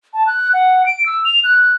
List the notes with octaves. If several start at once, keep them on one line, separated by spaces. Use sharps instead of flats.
A5
F#6
F#5
D7
E6
F7
F#6